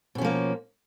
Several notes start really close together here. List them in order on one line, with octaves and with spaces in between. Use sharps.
B2 C#4 F3 A#3